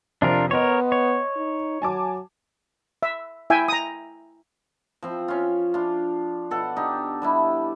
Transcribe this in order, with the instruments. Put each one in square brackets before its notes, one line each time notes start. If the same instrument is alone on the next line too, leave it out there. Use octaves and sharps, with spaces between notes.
[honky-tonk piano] F2 C3 [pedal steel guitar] D4 F4 A#4
[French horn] B3 [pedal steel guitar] A#4 C#5 [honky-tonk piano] D#5 C6
[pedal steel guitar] C#5
[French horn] D#4
[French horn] F#3 [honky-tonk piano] G#5 A5 D6
[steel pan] E5
E4 E5 G5 G#5
A#5 D#6
[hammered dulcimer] F3 C4
C#4 F4
D4 F4
B2 A4 F#5
D4 D#4 G4
G3 D4 E4